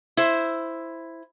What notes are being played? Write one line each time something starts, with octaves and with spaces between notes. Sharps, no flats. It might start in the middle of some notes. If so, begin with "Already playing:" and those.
E4 C5